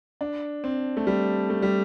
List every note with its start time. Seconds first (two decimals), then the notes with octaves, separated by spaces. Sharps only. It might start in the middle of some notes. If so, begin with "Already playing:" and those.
0.21 D4
0.64 C4
0.97 A3
1.07 G3
1.50 A3
1.62 G3